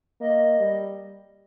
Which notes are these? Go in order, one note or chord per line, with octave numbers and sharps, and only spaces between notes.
A#3 D#5
G3